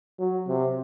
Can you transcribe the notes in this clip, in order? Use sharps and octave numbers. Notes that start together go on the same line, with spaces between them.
F#3
C3